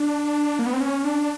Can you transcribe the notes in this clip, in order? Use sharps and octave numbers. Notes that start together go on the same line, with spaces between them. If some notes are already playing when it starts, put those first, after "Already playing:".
Already playing: D4
A#3
B3
C4
C#4
D4